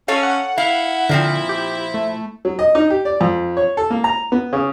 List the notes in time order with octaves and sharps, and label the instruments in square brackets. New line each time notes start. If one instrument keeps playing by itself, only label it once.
[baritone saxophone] C#4 [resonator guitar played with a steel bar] A4 C#5 F5
[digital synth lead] F#5
[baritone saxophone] E4 [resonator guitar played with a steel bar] F5
[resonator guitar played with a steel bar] A#2 F3 C4 [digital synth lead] D3
[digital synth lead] G4
A3
[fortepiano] F#3
D#5
D#4
G4
D5
F2
C#5
A4
A#3
A#5
B3
C#3